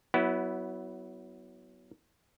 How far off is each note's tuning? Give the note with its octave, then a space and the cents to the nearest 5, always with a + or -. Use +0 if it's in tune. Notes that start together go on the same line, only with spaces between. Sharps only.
F#3 +15 B3 +0 E4 -15